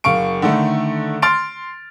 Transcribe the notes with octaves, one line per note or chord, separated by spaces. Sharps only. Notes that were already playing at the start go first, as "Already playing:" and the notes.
F#1 F5 C#6 D7
D3 D#3 A3
C6 F6 A6 D7